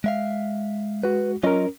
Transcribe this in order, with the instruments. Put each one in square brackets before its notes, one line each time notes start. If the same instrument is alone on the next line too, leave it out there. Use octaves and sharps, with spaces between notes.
[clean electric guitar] G#3 E5 F5
[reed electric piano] G#3 F#4 [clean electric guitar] B4
[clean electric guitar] F#3 F4 D#5 [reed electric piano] C#4 A#4